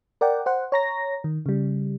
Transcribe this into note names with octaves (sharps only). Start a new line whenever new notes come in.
A#4 D5 F#5 G5
C5 F#5
C#5 A#5 A#6
D#3
C#3 G3